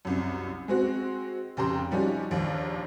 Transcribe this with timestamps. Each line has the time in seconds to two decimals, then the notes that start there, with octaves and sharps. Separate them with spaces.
0.05 C2 F#2
0.68 G#3 C4 F#4
1.57 F1 C#3 G4 G5 A#5 C6
1.91 F3 G3 C#4 D#4 F#4 G4
2.31 A#1 D#2